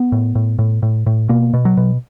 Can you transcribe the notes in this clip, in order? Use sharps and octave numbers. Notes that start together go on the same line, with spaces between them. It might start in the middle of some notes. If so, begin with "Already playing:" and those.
Already playing: B3
A2
A2
A2
A2
A2
B2 A#3
B2
F#3
B2